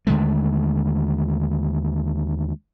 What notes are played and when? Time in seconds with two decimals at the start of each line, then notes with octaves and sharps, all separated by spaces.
0.07 D#2 D3 G#3 A3